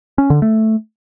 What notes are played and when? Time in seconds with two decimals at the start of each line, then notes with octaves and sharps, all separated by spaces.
0.18 C#4
0.30 D3
0.42 A3